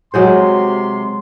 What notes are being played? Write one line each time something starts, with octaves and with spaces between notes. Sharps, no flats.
C3 F#3 G#3 C5 C6